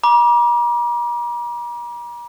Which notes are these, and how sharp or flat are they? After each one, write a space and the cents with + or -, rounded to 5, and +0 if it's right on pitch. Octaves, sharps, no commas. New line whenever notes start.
A#5 +45 D6 +0